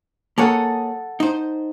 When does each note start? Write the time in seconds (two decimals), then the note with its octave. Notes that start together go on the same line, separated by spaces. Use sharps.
0.38 A#3 G#4 A4 C#5 F#5 A5
1.20 D#4 C5